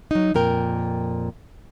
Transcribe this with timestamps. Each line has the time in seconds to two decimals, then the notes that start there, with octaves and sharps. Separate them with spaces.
0.11 F#3 D#4
0.34 F2 A#2 A#4 G5